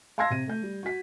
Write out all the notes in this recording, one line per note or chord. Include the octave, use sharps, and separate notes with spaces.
F5 A5 C6 E6 G#6 A#6
C3 D#7
A3 G6
G3
F#4 B6